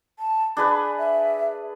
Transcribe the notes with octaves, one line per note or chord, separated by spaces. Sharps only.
A5
D4 G#4 B4 B5
E5